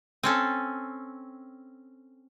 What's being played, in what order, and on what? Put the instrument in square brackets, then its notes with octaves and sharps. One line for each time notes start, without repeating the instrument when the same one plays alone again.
[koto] C4 C#4 A4